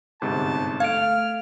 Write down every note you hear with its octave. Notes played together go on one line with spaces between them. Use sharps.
G1 G#2 C3 A5
A3 F5 F6 G#6 D7